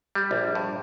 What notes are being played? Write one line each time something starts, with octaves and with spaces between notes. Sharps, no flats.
G3
A#1
G2